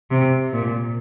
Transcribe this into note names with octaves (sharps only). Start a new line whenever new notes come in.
C3
A#2